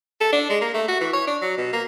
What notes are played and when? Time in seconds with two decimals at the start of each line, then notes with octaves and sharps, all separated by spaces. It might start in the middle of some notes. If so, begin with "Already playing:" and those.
0.20 A4
0.32 D4
0.49 G#3
0.61 A#3
0.74 A3
0.88 F#4
1.01 E3
1.13 C#5
1.27 D4
1.42 F#3
1.57 B2
1.73 A#3